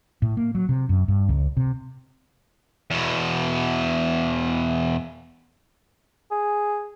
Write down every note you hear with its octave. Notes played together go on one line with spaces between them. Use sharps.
A2
A#3
F#3
C3
F#2
G2
C#2
C3
E2 B2
G#4